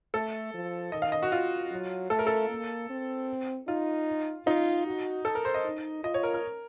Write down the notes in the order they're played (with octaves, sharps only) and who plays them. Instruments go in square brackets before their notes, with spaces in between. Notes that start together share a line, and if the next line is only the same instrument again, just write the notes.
[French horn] A3 [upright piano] A4
[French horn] F3
[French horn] D#3 [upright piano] D#5
[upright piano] F5
D#5
F#4
F4
[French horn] F#3
[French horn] A3 [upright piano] A4
[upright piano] A#4
A4
[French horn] A#3
C4
[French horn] D#4 [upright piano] F4
[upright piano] D#4 [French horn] F4
[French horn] F#4
[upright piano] A4
A#4
C5
D#5
[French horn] D#4
[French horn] F4 [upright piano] D#5
[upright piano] C#5
A#4
A#4